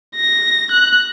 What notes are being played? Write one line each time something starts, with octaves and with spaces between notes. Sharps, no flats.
A#6
F#6